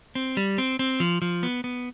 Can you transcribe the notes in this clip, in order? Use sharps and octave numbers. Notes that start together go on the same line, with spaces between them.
C4
G3
C4
C4
F3
F3
B3
B3